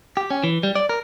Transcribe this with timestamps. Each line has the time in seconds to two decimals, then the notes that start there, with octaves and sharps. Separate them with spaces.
0.17 G4
0.30 C#4
0.43 E3
0.63 G3
0.76 D5
0.89 A#4